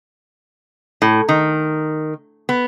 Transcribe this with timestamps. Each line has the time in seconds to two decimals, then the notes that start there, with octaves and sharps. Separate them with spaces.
1.02 A2
1.29 D#3
2.49 B3